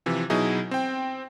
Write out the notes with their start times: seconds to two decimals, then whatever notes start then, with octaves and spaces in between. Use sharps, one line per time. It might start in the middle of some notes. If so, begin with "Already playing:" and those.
0.06 C3 E3 F3
0.30 B2 F#3 D#4 E4 G#4
0.71 C4 G5